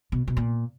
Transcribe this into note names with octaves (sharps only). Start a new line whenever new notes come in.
B2
B2
A#2